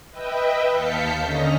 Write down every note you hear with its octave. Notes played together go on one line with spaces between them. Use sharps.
B4 D#5 E5 G5
D#2 F5 A5 G6 B6 C#7
D3 C#4 D#5 A#5 A#6